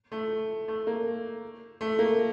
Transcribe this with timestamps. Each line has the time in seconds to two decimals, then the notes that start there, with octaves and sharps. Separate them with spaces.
0.12 A3
0.68 A3
0.87 A#3
1.81 A3
1.99 A#3